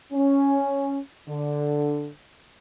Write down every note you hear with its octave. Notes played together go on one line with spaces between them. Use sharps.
C#4
D3